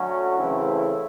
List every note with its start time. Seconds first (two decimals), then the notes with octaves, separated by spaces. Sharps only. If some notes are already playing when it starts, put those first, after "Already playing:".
Already playing: D3 F#3 A3 C#4 F#4
0.37 C#3 E3 A3 C4 E4